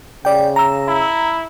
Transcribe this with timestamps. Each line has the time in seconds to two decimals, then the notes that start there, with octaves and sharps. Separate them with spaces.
0.25 C#3 D5 G5
0.56 A#5 E6
0.88 E4